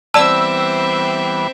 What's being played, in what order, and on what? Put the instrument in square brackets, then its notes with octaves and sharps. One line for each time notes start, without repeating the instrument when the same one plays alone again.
[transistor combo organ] E3 G3 B3 [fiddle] C4 E5 [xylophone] D5 A5 [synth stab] E6